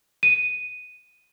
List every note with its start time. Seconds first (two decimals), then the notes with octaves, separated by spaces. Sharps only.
0.23 D#7